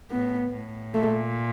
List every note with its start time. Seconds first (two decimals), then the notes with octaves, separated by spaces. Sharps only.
0.11 A2 B3
0.52 A2
0.94 A#2 A3